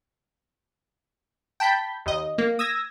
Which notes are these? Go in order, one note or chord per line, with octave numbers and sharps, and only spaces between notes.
G5 A5 B5 G6 B6
D#2 D#5
A#3
D#6 E6 G#6 A#6